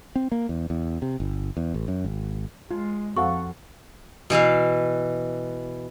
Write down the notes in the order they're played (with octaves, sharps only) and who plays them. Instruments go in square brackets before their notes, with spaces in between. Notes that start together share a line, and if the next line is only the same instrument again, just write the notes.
[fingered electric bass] C4
A#3
E2
E2
C3
G1
E2
A1
F#2
G#1
[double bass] G#3 [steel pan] F4
[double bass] F2 [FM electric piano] C4 F5 F#5 [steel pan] F#4 A4 [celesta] C#6
[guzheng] B2 E3 E5 F5